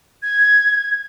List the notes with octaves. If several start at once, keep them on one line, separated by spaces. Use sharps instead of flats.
G#6